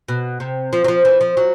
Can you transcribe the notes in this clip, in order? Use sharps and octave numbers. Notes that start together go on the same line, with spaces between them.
B2
C3
F3
F#3
F3
E3
F3
F#3